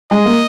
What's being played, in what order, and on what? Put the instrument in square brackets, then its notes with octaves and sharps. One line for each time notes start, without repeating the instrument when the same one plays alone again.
[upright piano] G#3 [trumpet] D#5
[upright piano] A#3